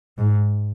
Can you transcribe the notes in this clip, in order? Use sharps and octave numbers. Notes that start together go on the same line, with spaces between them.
G#2